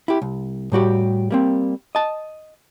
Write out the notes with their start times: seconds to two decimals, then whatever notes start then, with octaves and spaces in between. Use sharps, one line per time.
0.08 E4 G4
0.22 C2
0.72 A2 G3 F#4 G4
1.31 G3 A#3 C4
1.95 D#5 A5